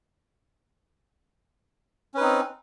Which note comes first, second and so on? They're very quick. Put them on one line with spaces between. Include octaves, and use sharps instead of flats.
C#4 B4 D#4 C4